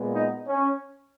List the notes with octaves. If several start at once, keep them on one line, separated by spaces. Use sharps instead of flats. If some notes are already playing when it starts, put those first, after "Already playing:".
Already playing: A#2 G#3 B3
D#4
C#4